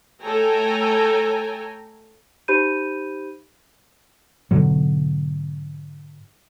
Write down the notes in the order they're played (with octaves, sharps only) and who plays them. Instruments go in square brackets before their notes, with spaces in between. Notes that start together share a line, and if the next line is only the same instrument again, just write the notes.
[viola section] A3 A4 C#5 G5 G#5 A#5
[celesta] D#4 G4 C5 B5 G6 D#7
[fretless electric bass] G#2 B2 D3 F#3